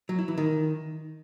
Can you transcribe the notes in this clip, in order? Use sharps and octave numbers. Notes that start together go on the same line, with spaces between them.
F#3
E4
E3
D#3